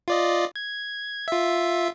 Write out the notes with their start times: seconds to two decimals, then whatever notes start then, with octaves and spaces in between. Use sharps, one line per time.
0.08 F4 D5 D#5
0.56 G#6
1.28 F4 E5